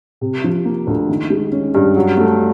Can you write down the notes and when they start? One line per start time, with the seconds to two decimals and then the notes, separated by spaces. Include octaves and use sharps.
0.21 C3
0.44 F3
0.65 A#3
0.87 D2
1.09 D#3
1.30 G#3
1.52 C#4
1.75 G2
1.96 F#3
2.17 A3